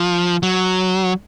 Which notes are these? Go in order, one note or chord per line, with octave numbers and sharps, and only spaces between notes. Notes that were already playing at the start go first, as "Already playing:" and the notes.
Already playing: F3
F#3